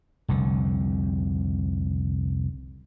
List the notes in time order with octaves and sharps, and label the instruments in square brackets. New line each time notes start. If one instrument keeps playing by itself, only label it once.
[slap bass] F1 C2 D3